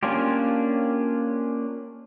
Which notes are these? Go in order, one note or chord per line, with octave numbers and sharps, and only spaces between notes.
A#3 C#4 D4 F4 G4